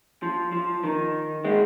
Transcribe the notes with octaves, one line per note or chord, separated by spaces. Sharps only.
F3
F3
D#3
G#3 C4